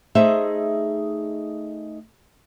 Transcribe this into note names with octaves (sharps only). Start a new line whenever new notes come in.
A3 D#4 G#4 C5 D#5 E5